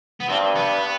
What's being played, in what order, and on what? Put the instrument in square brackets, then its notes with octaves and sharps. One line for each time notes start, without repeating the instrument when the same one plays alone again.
[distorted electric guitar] B3
[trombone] G2 [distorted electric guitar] C4
[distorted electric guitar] B3